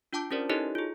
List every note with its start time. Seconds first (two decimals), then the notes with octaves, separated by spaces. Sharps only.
0.13 D4 F4 G5 A5 D6
0.31 C#4 G4 A#4 C5 D5
0.49 D#4 E4 G4 A4 C#5 D#5
0.75 F4 G#4